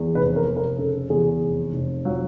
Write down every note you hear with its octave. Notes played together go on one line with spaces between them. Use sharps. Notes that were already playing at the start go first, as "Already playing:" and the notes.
Already playing: E2
F1 B4
A#4
F1
A#4
C#3 A4
E2 G#4
F1
F1
F#3 F4